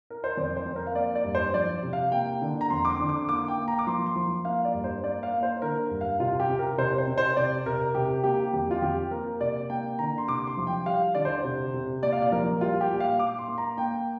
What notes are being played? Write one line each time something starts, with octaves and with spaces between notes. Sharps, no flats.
A#4
C5
F2 D5
C5
F2
A#4
F5
A#3 D5
D5
G2
C5
F3 D5
C3
F5
A#3 G5
D3
A#5
F2 C6
D6
C6
D3
D6
A#3 D6
G5
A#3
A#5
D6
F3 C6
C6
F3
A#3 F5
D5
G2
C5
A#3 D5
F5
A#3
C5
D3 A#4
G2
F5
C3 F4
G4
C3
A#4
C3 C5
C5
C3
C5
C3 D5
C3 A#4
C3 G4
A#3 G4
F2 G4
F4
F2 G4
A#3 A#4
C3 D5
A#3 G5
D3 A#5
C6
C3 D6
C6
F3
G5
G3 F5
D3 D5
C5
C3
C3
A#2 D5
F5
D5
F3 A#4
G3 F4
G4
A#2
F5
A#2 D6
C6
A#3
A#5
A#3 G5